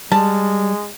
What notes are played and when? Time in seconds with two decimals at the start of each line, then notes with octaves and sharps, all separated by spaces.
0.12 G3 G#3 A5